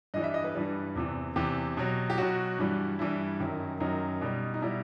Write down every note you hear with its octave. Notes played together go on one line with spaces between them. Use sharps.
G2 E3 G3 D#5
E5
D#5
B4
G2 E3 G3
E2 C3 E3
E2 C3 E3 G4
B2 F#3
G4
B2 F#3 F#4
G2 E3 G3
G2 E3 G3 E4
F#2 D#3 F#3
F#2 D#3 F#3 D#4
B2 G3
D#4
B2 G3 E4